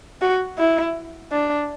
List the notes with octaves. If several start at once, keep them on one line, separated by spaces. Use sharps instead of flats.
F#4
E4
D4